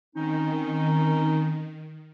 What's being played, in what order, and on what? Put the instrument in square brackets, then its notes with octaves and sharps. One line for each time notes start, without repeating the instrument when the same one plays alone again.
[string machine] D#3 [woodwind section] C4 C#4 D#4